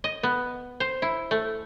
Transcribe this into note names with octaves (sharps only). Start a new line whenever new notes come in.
D#5
B3
C5
E4
A3